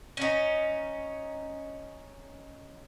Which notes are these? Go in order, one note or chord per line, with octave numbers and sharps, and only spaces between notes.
C#4 D#4